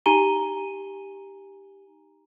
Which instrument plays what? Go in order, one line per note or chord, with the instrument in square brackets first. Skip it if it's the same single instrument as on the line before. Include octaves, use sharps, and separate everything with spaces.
[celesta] D#4 G4 G#5 A#5 D#7 G7